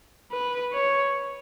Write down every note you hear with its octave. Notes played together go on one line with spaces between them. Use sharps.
B4
C#5